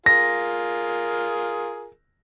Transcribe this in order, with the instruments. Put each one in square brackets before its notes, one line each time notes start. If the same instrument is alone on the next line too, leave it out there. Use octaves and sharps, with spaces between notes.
[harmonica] F4 G#4 A#4 [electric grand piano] A#6